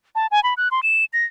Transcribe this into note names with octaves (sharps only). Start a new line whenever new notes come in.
A5
G#5
B5
F#6
C6
E7
A#6